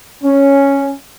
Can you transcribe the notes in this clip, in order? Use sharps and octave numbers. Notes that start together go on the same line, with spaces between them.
C#4